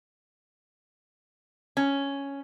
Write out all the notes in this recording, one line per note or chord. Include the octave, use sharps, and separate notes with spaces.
C#4